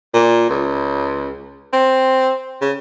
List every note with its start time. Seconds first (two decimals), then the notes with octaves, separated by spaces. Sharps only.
0.14 A#2
0.49 C#2
1.73 C4
2.62 C#3